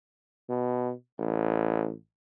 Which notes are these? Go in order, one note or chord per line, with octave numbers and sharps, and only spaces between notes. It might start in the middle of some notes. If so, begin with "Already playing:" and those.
B2
A1